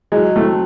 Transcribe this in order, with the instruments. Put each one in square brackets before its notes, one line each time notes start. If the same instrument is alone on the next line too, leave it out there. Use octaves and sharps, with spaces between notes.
[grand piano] F#3 [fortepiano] G#3
[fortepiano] A3 [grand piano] C4